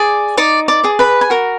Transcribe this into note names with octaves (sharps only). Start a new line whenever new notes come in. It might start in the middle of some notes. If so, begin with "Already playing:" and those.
Already playing: G#4 D5
D#4 D5 D6
D5 D6
G#4 D5
B4 B5
G#5
F#4 A#4 A#5